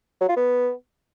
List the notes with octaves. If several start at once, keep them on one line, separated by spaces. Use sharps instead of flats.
F#3
F4
B3